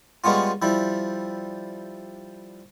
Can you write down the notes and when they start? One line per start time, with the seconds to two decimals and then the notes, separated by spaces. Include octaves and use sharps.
0.24 G3 G#3 B3 C#4 F4
0.62 F3 G3 E4